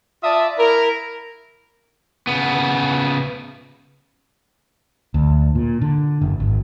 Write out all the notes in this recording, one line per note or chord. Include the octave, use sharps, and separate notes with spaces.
F4 D5 E5 A5 D#6
E4 A#4
C#3 B3
D2
A#2
D3
F#1
G#1